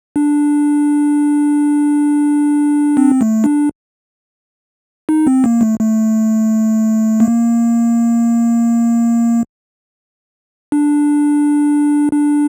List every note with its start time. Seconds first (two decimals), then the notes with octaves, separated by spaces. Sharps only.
0.16 D4
2.97 C4
3.21 A3
3.44 D4
5.09 D#4
5.27 C4
5.44 A#3
5.61 A3
5.80 A3
7.20 A#3
10.72 D4
12.12 D4